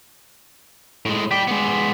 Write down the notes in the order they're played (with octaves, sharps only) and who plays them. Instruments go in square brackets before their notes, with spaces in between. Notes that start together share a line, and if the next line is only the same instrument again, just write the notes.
[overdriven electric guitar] A2 G#3
[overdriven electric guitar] G3 G5 [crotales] D6 B6
[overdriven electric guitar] G#3 B3